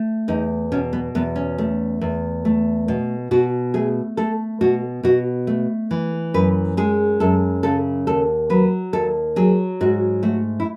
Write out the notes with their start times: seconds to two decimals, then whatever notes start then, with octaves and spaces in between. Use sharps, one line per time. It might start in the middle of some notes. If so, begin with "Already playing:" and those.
Already playing: A3
0.28 E2 D#4
0.72 B2 C#4
0.93 B3
1.15 E2 B3
1.36 C#4
1.58 A3
2.01 E2
2.45 A3
2.88 B2
3.31 B2 F#4
3.74 A3 G#4
4.17 A3 A4
4.61 B2 F#4
5.03 B2 F#4
5.47 A3
5.91 E3
6.34 F#2 B4
6.77 G#3 G#4
7.20 F#2 A4
7.63 C#3 A4
8.07 D#2 A4
8.50 F#3 B4
8.93 D#2 A4
9.36 F#3 G#4
9.81 G#2 F#4
10.23 A3 F#4
10.60 E4